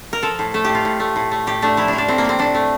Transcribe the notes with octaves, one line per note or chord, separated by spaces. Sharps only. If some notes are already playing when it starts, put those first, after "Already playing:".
A#4
F3 A4
A2
A3 A4
A2 G4
F4
A2
A3
A2
A3
A2 G4
A3 D4
F3 E4
D4
F3
D4
A2 C4
A#3
A2 C4
A2 D4
A3